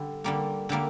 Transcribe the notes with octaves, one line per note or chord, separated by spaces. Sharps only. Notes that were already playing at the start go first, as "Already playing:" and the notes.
Already playing: D3 G3
D3 G3 A#3
D3 G3 A#3